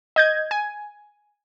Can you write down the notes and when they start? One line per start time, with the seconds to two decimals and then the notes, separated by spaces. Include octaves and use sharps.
0.16 D#5 G6 G#6
0.51 G#5